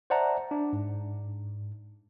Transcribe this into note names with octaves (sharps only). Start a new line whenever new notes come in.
C5 D5 E5 F#5 A5 A#5
D4
G#2